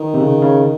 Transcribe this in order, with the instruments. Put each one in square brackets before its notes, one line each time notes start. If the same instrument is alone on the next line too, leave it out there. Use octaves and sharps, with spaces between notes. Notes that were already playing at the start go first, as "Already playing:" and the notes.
Already playing: [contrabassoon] D#3
[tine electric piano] C3
C#3
C#3